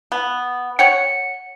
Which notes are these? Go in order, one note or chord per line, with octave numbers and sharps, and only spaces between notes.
B3
C#5 F#5 G5 C#7